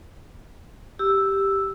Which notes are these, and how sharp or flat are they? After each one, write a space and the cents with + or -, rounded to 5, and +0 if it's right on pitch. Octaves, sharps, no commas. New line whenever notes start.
G4 +0 E6 +0